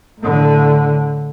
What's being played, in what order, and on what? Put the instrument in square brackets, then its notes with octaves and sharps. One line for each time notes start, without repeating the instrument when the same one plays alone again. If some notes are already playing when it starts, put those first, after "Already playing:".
[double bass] A2 D3